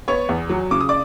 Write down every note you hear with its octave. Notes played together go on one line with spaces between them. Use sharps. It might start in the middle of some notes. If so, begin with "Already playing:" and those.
B3 C#5 C#6
E2
F#3
C#3 D6
D#6
D5 D6